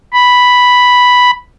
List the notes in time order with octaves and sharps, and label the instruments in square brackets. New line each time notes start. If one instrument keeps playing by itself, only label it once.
[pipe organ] B5